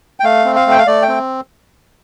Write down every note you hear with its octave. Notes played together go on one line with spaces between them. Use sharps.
G5
A3 F5
C4
F5
A3 G5
F5
A3 D5
G5
C4